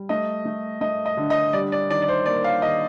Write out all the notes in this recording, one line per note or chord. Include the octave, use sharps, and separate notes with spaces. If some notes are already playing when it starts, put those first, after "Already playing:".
Already playing: G3
A3 D#5
A3
A3 D#5
D#5
D3
D#5
G3 D5
D5
D#3 D5
D5
C5
A#3 D5
F5
D#3 D#5